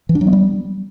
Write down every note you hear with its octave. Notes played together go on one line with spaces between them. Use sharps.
E3
D4
F#3
B3
G3